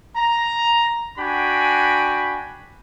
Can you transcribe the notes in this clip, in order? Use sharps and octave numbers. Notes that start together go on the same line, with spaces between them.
A#5
D4 F#4 G5 G#5 B5